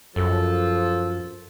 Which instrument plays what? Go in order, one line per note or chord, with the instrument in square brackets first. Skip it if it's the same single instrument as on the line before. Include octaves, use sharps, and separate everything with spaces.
[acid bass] F#2 [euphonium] F3 [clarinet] A4